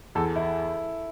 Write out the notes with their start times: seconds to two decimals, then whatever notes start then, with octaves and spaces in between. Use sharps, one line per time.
0.15 E2 A4
0.36 E4